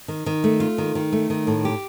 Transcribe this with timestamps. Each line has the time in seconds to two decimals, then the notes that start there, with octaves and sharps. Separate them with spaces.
0.08 D#3
0.26 D#3
0.44 A3
0.60 F4
0.78 D#3
0.95 D#3
1.12 A3
1.30 D#3
1.47 A2
1.65 G4